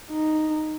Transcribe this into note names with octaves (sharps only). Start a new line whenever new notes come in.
D#4